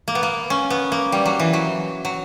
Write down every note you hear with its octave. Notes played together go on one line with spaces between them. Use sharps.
A#3
B3
A#3
C#4
B3
A#3
G3
F#3
E3
F#3
F#3